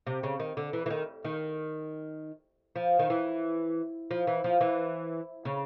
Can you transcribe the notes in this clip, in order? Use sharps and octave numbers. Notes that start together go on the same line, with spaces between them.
C3
C#3
D#3
D3
E3
E3
D#3
D#3
F3
D#3
E3
F3
E3
F3
E3
C#3